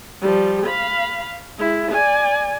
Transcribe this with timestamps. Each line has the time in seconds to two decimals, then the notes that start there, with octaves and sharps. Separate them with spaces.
0.21 F3 G3
0.66 F5 B5
1.59 G#3 E4
1.91 D5 G#5